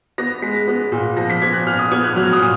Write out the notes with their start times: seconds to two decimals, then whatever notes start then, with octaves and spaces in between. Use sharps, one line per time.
0.18 B3 A#6
0.42 G#3 B6
0.68 B3
0.92 A#2
1.17 F3 A#6
1.30 B6
1.42 B3 G#6
1.54 F#6
1.67 A#2 F6
1.79 D#6
1.91 B3 G#6
2.04 F#6
2.16 F#3 F6
2.33 D#6
2.41 A#2